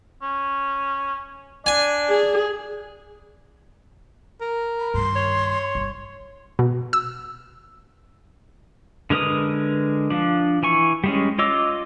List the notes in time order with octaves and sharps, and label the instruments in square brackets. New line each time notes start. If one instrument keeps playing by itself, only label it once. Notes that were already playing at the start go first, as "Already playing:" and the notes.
[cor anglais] C#4
[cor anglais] D4 [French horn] D5 [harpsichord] G#5
[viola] G#4
[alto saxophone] A#4
[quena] B5
[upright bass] G2 D#3 [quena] C6
[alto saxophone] C#5
[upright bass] G1
[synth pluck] B2
E6
[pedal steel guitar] D3 G#3 A#4 B4 D#6
F3 D4
E3 G#5 C#6
G3 G#3 C#4
F4 C#5 D#5 D6 E6